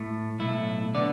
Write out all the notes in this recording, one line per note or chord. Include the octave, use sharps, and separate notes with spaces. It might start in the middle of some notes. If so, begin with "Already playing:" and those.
Already playing: A2 A3
B1 A2 A3 E4
D3 B3 D5